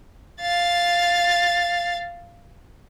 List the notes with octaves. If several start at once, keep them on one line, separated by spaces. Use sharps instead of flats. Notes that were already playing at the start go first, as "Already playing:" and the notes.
F5 A6